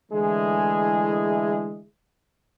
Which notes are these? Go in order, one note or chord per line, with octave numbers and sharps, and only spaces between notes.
D3 E3 G#3 A3 E4 G#4